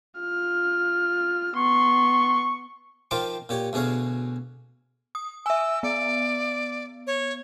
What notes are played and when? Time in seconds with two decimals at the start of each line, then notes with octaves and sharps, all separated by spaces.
0.21 F4 F6
1.56 B3 C6 C#6
3.11 D#3 F3 F4 C5 G5 D6
3.49 A#2 G4 C#5
3.73 D2 B2 G#4 C#5 F5
5.15 D#6
5.46 E5 G#5 E6
5.83 B3 D5
7.07 C#5